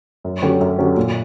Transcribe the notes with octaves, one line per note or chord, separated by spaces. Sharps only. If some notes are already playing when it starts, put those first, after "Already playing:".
F#2
D3 F#3 C#4 G4
F#2
D3 F#3 C#4 G4
A#2